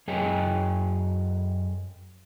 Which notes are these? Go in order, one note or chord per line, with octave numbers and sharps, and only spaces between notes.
F#2 G#4 C#5 D#5 G5 G#5